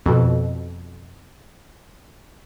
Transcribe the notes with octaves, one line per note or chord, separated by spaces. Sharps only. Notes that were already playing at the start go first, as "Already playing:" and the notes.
F2 B2